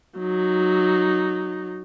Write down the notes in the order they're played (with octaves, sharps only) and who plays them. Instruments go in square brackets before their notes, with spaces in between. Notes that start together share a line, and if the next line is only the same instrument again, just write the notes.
[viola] F#3 D#4